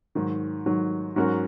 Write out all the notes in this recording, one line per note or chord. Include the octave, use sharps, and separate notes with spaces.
G#2 D#3 F#3
G#2 D#3 F#3
G#2 F#3 C#4 F#4 A#4